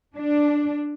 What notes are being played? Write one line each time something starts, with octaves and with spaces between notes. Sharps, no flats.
D4